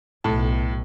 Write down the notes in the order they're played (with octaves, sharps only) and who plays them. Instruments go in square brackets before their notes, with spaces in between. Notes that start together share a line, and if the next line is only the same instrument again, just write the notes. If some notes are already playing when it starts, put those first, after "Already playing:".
[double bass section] B1 [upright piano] A2 A5